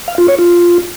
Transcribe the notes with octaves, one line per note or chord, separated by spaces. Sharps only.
F5
F4
C#5
F4